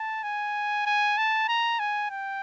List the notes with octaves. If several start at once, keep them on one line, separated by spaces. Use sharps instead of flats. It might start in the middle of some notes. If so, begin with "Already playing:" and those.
Already playing: A5
G#5
G#5
A5
A#5
G#5
G5